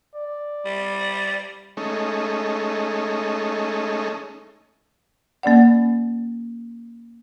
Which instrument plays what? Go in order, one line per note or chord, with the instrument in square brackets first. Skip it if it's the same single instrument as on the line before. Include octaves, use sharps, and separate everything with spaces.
[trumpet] D5
[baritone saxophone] G3
[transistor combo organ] G#3 A3 C#4 D#4
[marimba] A#3 C#4 D5 F#5